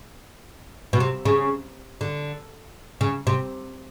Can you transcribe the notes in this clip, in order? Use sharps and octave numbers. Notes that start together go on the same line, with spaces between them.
B2
C3
C#3
D3
C#3
C3